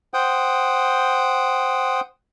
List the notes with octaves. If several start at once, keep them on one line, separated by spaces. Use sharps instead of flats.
C5 F#5 G5 D#6